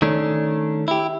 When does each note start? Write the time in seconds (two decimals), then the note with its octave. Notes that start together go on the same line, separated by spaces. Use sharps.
0.02 D#3 A3 C#4 D4
0.88 E4 G4